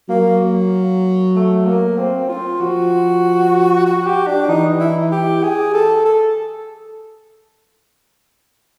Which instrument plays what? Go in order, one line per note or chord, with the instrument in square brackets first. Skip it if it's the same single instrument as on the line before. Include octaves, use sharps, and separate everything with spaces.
[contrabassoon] F#3 [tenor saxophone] A#3
[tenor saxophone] A3
A#3
C4
F4
[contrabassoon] F3 [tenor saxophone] F#4
[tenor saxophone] F#4
G4
D4
[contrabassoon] E3 [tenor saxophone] D#4
[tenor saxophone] E4
G4
G#4
A4
A4